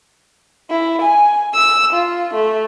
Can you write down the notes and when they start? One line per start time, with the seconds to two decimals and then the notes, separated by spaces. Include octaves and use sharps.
0.70 E4
1.02 G#5
1.54 E6
1.93 F4
2.34 A3